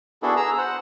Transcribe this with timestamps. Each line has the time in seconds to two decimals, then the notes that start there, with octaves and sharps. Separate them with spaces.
0.23 B3 D4 E4 F#4 G#4 A4
0.37 G#4 A#5 E6
0.58 C5 F#5